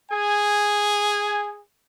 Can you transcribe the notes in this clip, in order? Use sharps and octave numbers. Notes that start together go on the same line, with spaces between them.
G#4 G#5